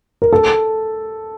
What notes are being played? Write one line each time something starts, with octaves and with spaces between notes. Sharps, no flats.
A#4
A4